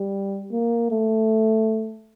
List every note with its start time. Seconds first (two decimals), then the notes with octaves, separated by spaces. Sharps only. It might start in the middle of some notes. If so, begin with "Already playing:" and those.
Already playing: G3
0.52 A#3
0.91 A3